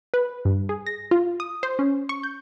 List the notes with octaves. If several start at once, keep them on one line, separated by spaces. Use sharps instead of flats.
B4
G2
G#4
A#6
F4
D#6
C5
C#4
C#6
G6